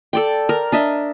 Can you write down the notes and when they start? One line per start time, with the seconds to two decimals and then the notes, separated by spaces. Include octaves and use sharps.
0.13 A4 D5 G5
0.49 A#4
0.72 D4 D#5 E5